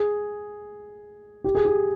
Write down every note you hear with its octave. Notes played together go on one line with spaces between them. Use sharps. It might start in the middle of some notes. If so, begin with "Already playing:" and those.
Already playing: G#4
G4
G#4
G4